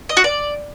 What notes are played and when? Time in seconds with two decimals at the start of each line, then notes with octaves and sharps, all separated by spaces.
0.09 D#5
0.17 F#4
0.24 D5